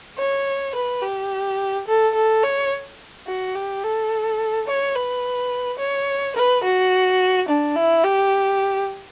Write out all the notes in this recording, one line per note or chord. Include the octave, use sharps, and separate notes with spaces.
C#5
B4
G4
A4
A4
C#5
F#4
G4
A4
C#5
B4
C#5
B4
F#4
D4
E4
G4